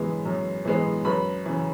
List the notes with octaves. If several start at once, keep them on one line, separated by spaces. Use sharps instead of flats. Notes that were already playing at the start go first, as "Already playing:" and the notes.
Already playing: F#2 E3 G#3 B3
F#2
E3 G#3 B3
F#2 B4 B5
C#3 E3